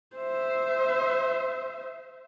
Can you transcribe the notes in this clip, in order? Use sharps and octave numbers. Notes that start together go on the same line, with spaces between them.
C5 E5